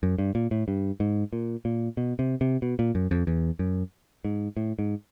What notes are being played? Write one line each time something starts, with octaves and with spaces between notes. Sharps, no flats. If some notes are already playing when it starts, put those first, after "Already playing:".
F#2
G2
A#2
A2
G2
G#2
A#2
A#2
B2
C3
C3
B2
A#2
F#2
F2
E2
F#2
G#2
A2
G#2